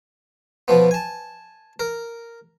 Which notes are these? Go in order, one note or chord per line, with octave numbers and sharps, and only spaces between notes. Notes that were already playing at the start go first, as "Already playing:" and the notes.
B2 F3 B3
G#5 A5
A#4